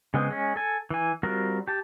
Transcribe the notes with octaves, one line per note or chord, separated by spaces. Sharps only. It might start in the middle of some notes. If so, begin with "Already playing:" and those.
C#3 G#3 B3 C4
G#3 C#4
A4 G#5
E3 G#5
G3 C4 F4 F#4 A#4
G4 A5